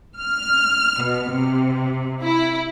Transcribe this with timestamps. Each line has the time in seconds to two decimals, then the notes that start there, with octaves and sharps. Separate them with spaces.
0.17 F6
1.02 B2
1.34 C3
2.23 E4